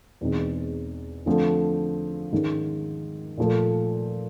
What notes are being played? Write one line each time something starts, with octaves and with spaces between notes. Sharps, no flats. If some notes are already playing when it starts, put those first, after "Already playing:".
E2 B2 G#3 C4 D#4
D3 F3 A3 C4
G#2 D#3 G#3 C#4
A#2 F3 A3